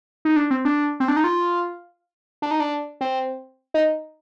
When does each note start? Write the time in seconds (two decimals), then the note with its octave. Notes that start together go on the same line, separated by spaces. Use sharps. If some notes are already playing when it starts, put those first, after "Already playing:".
0.25 D#4
0.36 D4
0.51 C4
0.65 D4
1.00 C4
1.08 D4
1.16 D#4
1.24 F4
2.42 D4
2.51 D#4
2.60 D4
3.01 C4
3.74 D#4